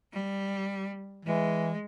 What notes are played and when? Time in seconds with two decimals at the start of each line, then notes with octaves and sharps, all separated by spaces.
0.13 G3
1.25 E3 G#3